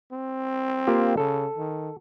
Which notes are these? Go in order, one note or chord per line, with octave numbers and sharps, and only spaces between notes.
C4
A#3 F4 G4
C#3 A4
D#3